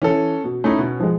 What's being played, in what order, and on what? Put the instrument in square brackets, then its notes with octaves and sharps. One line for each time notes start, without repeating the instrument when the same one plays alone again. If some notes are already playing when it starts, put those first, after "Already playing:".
[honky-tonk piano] E3 [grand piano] C#4 A4
[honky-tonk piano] B2
[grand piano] A3 D#4 E4 [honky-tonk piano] C#4
[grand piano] B2
[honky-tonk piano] F3 G#3